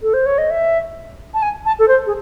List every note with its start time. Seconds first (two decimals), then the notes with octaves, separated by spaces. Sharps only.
0.01 A4
0.13 C5
0.26 C#5
0.38 D#5
0.50 E5
1.33 A5
1.42 G#5
1.65 A5
1.79 A4
1.88 C5
2.06 G#4